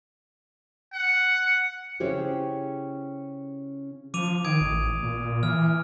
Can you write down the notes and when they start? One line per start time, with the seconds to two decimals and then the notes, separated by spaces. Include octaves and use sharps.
0.94 F#5
2.00 C#3 C#4 E4 G4 G#4 C5
4.14 F3 D6 D#7 F7
4.44 D#3 D#6 G#6 D7
4.61 A1
5.03 A#2
5.43 E3 F6